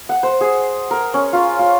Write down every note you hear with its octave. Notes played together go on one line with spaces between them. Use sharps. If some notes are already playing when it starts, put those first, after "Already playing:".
F#5
C5
G#4
A#4
C#4
F4
F4